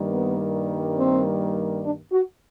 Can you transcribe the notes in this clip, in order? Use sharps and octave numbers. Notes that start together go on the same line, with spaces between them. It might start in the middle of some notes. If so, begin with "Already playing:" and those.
Already playing: G2 D#3 G3 A#3
B3
C4
D4
F#4